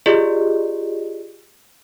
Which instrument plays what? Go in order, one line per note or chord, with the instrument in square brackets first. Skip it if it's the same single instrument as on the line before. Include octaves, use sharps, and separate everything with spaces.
[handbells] F4 G4 G#4 D5 D#5